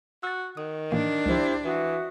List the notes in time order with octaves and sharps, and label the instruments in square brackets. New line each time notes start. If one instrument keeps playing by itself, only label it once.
[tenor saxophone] F#4 [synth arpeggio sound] E6 A6
[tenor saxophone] D#3 [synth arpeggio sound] D#6
[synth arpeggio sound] A2 E3 A#3 [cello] D4
[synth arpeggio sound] C#2 F3 [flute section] E4 G4 C5
[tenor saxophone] E3 [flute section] F#4 E5 D#6